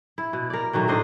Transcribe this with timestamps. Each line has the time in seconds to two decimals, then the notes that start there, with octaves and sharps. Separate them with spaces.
0.18 E4
0.33 B2
0.50 A#4 D5
0.73 B2 D#3 F#3 A3
0.88 A2 D4 C5 D#5